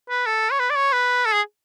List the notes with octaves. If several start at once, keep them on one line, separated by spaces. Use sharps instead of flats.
B4
A4
C#5
B4
D5
C#5
B4
A4
G#4